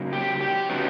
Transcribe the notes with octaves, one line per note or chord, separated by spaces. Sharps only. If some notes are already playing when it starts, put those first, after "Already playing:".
Already playing: C#3 F#3 A#3 D#4
G4
G4
C#3 F#3 B3 D#4